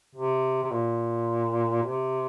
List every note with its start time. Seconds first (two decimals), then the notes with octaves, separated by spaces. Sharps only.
0.16 C3
0.63 C3
0.71 A#2
1.83 C3